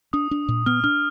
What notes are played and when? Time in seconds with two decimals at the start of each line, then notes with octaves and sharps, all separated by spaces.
0.13 D4 D#6
0.31 D4
0.48 A#2
0.66 B3 F6
0.84 D4 F6